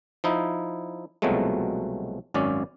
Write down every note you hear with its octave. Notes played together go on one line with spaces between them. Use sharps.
F3 D#4 E4
C2 B2 F3 F#3 G#3 A3
G#1 F#2 C#4 D5